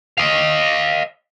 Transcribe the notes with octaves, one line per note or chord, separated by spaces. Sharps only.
D#5 F5